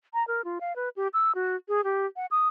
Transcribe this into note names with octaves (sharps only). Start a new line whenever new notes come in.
A#5
A#4
F4
F5
B4
G4
E6
F#4
G#4
G4
F#5
D#6